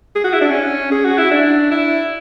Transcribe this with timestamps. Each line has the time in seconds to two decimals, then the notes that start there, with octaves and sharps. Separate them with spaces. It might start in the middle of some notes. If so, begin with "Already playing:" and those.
0.16 G#4
0.24 F#4
0.33 E4
0.42 D4
0.51 C#4
0.92 G#4
1.05 F#4
1.18 E4
1.31 D4
1.71 E4